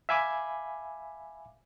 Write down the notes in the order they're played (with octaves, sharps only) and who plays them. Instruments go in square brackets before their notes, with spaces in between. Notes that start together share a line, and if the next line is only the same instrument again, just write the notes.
[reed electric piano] E5 F5 G#5 B5 D6